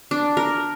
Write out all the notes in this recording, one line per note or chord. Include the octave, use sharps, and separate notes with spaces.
D4
A#4